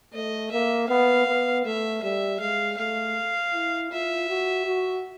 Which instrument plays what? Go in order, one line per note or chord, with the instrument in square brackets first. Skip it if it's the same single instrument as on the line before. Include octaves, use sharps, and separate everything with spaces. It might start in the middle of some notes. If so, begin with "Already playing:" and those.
[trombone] A3 [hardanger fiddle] D#5
[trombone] A#3 [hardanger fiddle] E5
[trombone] B3 [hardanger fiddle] F5
[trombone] B3
[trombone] A3 [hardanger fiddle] E5
[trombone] G3 [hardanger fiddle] E5
[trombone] G#3 [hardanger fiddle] F5
[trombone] A3 [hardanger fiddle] F5
[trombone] E4
[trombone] F4 [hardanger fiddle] E5
[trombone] F#4
F#4